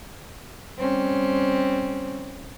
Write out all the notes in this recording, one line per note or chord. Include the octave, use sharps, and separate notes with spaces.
G3 C4 C#4